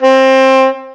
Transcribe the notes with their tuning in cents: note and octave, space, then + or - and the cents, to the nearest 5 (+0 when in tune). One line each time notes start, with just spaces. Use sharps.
C4 +20